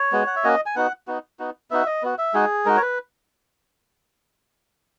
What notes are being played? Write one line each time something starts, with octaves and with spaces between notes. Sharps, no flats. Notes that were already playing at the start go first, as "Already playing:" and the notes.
Already playing: C#5
G#3 B3 F#4
F#5
E5
A#3 C#4 F#4 D#5
G#5
B3 D#4 F#4 F#5
B3 D#4 F#4
B3 D#4 F#4
B3 D#4 F#4 E5
D#5
B3 F#4
E5
G#3 D#4 F#4 G#4
G#3 D#4 F#4 A#4
C#5
B4